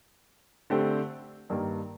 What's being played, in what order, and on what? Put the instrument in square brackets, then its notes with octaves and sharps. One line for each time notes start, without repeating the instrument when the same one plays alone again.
[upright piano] D3 A3 C4 G4 C5
G2 D#3 G3 A#3